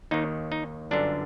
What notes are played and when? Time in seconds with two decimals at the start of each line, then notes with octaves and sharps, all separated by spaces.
0.11 D#2 D#3 D#4
0.52 D#4
0.91 G1 F#2 D3 D4